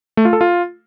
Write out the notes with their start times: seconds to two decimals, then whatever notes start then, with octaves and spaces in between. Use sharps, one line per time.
0.17 A3
0.25 F4
0.33 A4
0.41 F4